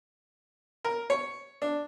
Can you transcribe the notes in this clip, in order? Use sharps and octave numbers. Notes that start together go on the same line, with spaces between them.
A#4
C#5
D4